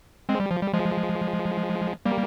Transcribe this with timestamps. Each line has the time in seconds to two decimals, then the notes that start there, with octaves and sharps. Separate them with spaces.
0.29 G#3 C4
0.40 G3
0.51 F3
0.61 G3
0.73 F3 G#3
2.05 G3 A#3